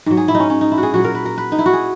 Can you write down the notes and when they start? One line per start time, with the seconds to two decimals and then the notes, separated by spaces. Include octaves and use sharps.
0.06 G#2 F#3
0.17 G#4
0.28 E4
0.35 D#4
0.40 C#4
0.50 C#4
0.61 D#4
0.72 E4
0.78 F#4
0.83 G#4
0.94 A#2 F#3 F#4
1.04 A#4
1.15 B4
1.25 A#4
1.38 B4
1.52 D#4
1.59 E4
1.66 F#4
1.73 G#4